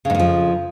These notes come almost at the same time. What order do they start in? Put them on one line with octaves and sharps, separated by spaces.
C#3 G#2 F2 F3